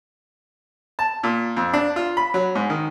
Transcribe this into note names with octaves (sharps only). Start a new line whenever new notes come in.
A5
A#2
F2
D4
F4
B5
F#3
G#2
D#3